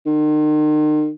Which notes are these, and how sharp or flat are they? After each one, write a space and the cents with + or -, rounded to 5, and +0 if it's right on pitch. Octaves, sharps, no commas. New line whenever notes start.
D#3 -40